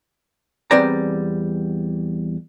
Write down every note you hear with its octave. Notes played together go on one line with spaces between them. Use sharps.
E2 G3 C4 B4 D5 A#5